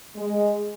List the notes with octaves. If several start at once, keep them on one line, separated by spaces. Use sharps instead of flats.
G#3